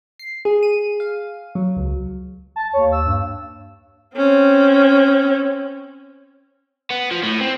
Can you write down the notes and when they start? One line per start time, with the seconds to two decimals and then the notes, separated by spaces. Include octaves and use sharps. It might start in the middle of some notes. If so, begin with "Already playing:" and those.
0.19 C7
0.45 G#4
0.63 D#7
1.00 F5
1.55 F#3
1.77 C#2
2.56 A5
2.73 D#2 C#5
2.92 E6
3.04 G2
4.15 C4 C#4
6.90 B3
7.11 F3
7.23 A2
7.41 C4